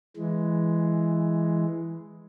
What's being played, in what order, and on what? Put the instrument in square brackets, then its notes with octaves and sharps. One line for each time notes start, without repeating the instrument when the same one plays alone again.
[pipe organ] E3 G#3